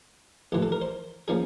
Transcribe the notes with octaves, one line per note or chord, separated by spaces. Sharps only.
A#1 A2 E3 G4
A4
A#4
C5
F3 A#3 C#4 G#4